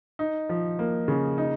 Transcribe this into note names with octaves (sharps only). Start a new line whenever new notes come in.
D#4
F3
A#3
C#3
D#4